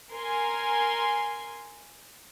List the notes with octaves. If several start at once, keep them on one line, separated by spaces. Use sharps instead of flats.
A#4 G#5 C6